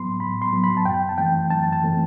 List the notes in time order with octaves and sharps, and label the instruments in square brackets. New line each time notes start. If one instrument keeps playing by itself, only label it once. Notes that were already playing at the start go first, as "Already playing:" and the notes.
Already playing: [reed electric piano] A2 F#3 B3 B5 C6
A2 B5
C6
F#3 B3
B5
A5
F#2 G5
A5
E3 A3 C4 G5
F#2 A5
A5
E3 A3 C4